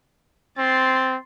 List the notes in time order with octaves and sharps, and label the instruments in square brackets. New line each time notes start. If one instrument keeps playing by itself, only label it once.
[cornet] C4 [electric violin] C6 A6